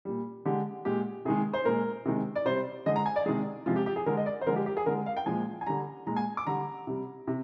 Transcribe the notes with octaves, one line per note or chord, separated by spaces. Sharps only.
A#2 G3
D3 G#3 G4
A#2 G#3 G4
C3 D#3 G#3 G#4
C5
A#2 G#3 A#4
C3 D#3 G#3
D5
C3 G3 C5
D3 G#3 D#5
A#5
G#5
D5
C3 D#3 G#3 G#4
C3 F3 G#3 F4
G4
G4
G#4
D3 G#3 A#4
D#5
D5
C5
D3 F3 G#3 A#4
G4
G4
G#4
D3 G#3 A#4
F5
G5
A#2 F3 G#3 G#5
G#5
D3 G3 A#5
A#2 G#3 A#5
G#5
D6
D3 G3 A#5
C3 G3
C3